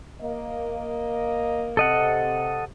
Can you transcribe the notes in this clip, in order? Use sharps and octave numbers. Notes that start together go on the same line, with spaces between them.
A#3 D#5
C3 A4 D#5 F#5